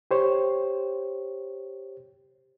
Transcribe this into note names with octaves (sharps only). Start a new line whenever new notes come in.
G4 C5 C#5